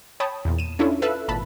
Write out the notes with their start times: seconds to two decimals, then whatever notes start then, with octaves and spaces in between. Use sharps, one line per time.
0.20 C#5 G5 A5 B5 D#6
0.45 E2 A#2
0.58 D#7 E7
0.79 C#4 D4 E4 F4 A4 C#5
1.02 A4 B4 E5 F5 E6 F#6
1.28 G#1 A#2 A5 B5